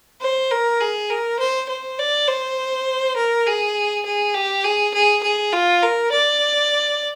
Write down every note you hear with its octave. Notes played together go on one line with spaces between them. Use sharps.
C5
A#4
G#4
A#4
C5
C5
D5
C5
A#4
G#4
G#4
G4
G#4
G#4
G#4
F4
A#4
D5